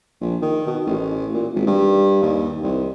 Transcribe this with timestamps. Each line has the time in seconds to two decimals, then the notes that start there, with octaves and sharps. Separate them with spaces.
0.21 A#1
0.42 D#3
0.67 B2
0.87 A1
1.34 A#2
1.56 G#1
1.67 G2
2.22 D#2
2.63 C2